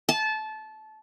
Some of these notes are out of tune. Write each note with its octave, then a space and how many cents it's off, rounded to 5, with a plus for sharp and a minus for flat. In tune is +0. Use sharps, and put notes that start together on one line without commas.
A5 -20